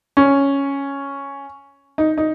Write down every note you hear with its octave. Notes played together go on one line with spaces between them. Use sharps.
C#4
D#4
D#4